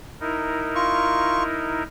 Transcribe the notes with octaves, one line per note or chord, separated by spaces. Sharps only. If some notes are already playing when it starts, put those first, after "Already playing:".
D#4 E4 A#4
F4 C#6